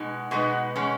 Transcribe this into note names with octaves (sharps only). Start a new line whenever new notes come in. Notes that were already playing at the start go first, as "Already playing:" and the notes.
Already playing: B2 G#3 B3 D#4
B2 G#3 B3 D#4
B2 G#3 C#4